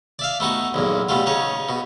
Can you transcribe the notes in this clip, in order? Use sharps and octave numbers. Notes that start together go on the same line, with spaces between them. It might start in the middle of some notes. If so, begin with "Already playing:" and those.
D5 E5 F5
A3 B3 D#4 F#4
B1 E2 A#2
B2 G3 A3 F4
C#3 D#4 C#5
B2